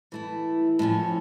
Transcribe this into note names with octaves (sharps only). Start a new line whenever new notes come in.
E3 A3 E4
A2 F3 C#4